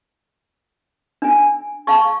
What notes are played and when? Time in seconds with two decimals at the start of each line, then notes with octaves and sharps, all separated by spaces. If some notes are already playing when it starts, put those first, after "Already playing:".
1.22 D4 G#5
1.87 F5 A5 C#6